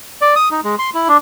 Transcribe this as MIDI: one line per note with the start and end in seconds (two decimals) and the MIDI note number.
0.21 0.35 74
0.36 0.49 87
0.51 0.60 63
0.64 0.75 56
0.79 0.90 84
0.94 1.08 64
1.08 1.17 62